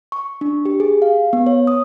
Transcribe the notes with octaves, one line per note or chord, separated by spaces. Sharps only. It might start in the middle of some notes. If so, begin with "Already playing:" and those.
C#6
D4
G4
G#4
F5
B3
C#5
D#6